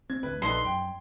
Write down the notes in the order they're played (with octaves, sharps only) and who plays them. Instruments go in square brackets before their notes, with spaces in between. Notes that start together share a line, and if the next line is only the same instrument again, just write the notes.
[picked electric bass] C4 [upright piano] G#6
[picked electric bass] A1 D2 [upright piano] B4
[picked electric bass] A#1 [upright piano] D#4 A4 B4 [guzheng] C6
[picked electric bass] F#2 [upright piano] G5